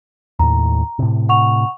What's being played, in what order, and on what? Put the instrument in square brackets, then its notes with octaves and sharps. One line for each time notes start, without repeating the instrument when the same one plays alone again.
[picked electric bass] D#2 A2 [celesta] A#5
[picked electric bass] A2 C3
[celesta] F#5 C#6 F7